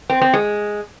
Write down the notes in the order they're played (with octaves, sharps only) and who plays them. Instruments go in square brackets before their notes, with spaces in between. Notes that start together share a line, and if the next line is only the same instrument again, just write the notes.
[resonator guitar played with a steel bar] C4
C4
G#3